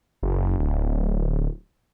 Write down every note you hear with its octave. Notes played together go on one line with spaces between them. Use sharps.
F#1
D1